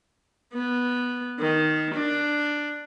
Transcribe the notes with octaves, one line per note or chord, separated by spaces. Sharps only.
B3
D#3
D4